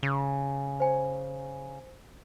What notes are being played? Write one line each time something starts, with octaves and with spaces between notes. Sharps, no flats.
C#3
C5 G#5